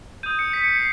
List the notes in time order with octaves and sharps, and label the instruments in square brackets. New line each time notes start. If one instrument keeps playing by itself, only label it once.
[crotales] D#6 G6 D#7
C#7
B6
C#7
C7